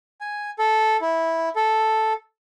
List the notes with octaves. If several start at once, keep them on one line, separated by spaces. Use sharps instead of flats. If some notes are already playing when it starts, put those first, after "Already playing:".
G#5
A4
E4
A4